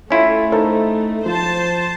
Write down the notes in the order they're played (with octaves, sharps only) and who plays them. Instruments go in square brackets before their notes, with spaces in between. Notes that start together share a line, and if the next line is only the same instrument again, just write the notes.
[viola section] A3 [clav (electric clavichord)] C#4 E4 F4
[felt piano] D#4 A4 C5
[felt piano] F3 [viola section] C5 A5